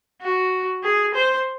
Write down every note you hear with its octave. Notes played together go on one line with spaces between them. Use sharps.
F#4
G#4
C5